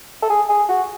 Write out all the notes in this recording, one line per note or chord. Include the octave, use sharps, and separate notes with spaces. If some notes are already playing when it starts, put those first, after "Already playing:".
A4
G#4
G#4
F#4